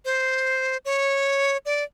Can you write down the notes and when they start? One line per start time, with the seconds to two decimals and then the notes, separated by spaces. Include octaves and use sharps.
0.05 C5
0.85 C#5
1.66 D5